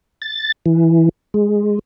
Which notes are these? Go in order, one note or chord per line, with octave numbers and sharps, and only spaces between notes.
A6
E3
G#3